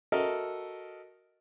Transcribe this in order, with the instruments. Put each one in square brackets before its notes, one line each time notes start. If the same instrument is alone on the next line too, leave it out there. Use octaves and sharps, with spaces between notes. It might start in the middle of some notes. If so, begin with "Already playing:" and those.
[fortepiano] F#4 A4 A#4 D#5 E5